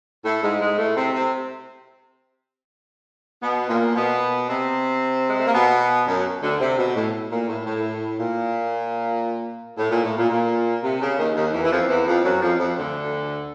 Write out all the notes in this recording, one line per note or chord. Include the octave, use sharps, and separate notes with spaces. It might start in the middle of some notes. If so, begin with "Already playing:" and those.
A2 A3
G#2 G#3
G#2 G#3
A2 A3
C3 C4
C3 C4
B2 B3
A#2 A#3
B2 B3
C3 C4
G#3
A3
A#3
B2 B3
F#2 F#3
D2 D3
C3
B2
A2
A#2
A2
A2
A#2
A2
A#2
A2
A#2
A#2
C3
C#3
D#2 D#3
D#2 D#3
E2 E3
E3
F2 F3
E2 E3
F2 F3
F#2 F#3
F2 F3
F2 F3
D2 D3